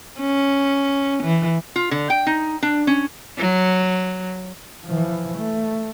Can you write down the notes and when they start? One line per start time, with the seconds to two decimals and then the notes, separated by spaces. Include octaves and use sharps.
0.20 C#4
1.23 E3
1.76 F4
1.91 D3
2.10 G5
2.27 D#4
2.62 D4
2.87 C#4
3.37 F#3
4.85 E3 F3
5.38 A3